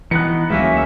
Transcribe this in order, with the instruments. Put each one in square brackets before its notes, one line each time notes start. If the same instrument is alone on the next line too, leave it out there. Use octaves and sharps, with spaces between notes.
[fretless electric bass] E3 [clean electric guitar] B3 D#4 [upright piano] F#6 C#7
[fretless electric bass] D2 F#3 G#3 [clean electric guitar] D#3 A#3 C#4 [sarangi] E5